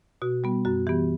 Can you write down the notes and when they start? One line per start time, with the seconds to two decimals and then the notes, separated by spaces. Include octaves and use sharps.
0.22 B2 F#4
0.44 G3 B3
0.65 F#2 F#4
0.87 E3 B3 G4